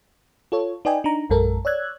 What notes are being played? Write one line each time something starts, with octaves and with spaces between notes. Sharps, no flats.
F4 A4 C#5
D#4 B4 D5 D#5 G5 G#5
D4 D#4 A#5
A#1 F#2 G#3 A4 A#4
C#5 D5 E6 F#6 G#6